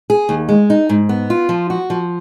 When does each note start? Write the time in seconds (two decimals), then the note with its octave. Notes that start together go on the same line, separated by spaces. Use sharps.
0.10 G#4
0.29 D#2
0.49 G#3
0.70 D#4
0.89 G#2
1.09 B3
1.30 F4
1.49 F3
1.70 F#4
1.90 F3